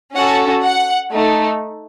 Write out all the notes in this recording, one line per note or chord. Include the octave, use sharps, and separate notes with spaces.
C#4 F#4 A4 F#5
F#5
A3 D#4